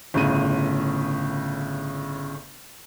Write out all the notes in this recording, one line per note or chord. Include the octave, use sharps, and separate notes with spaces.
G1 A2 C#3 D#7